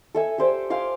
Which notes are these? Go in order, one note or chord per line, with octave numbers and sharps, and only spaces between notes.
A4 E5 G#5
G4 A4 C5 D5
F5 G#5 C6 D6